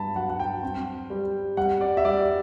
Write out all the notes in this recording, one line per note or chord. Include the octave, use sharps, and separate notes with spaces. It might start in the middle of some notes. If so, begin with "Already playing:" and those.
Already playing: G2 A5 B5
F#3 F#5
F#5
G5
C4
G3
G3 F#5
D5
E5
G3 D5